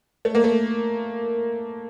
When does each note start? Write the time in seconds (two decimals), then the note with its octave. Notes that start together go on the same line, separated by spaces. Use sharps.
0.25 A3
0.35 A#3
0.44 A3